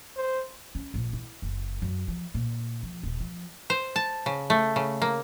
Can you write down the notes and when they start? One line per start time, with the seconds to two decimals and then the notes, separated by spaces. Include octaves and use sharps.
0.17 C5
0.75 C#4
0.94 A#1
1.13 E4
1.42 F#1
1.82 F#2
2.08 F3
2.34 A#2
2.83 F3
3.03 D#1
3.20 F3
3.70 C5
3.96 A5
4.26 C#3
4.50 A3
4.76 C#3
5.02 A#3